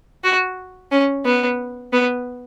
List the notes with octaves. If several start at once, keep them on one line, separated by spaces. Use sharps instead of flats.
F#4
C#4
B3
B3